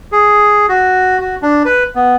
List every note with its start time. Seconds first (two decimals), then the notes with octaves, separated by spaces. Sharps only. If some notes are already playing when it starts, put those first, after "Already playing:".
0.12 G#4
0.69 F#4
1.19 F#4
1.42 D4
1.65 B4
1.95 B3